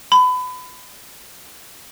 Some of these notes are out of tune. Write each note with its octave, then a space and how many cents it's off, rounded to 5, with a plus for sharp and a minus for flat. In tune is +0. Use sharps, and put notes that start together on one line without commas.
B5 +25